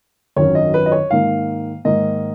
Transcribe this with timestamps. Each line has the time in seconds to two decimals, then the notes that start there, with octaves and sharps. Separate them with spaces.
0.36 G#1 F#2 D#3 F#3 C#4 C#5
0.55 D#5
0.74 B4
0.86 D#5
0.92 C#5
1.11 G#2 D#3 A#3 F5
1.85 G#2 D#3 A#3 D#5